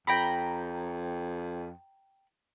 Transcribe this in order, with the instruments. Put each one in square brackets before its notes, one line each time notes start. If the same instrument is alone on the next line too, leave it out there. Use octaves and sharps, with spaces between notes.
[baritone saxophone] F2 [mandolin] G5 A#5 B5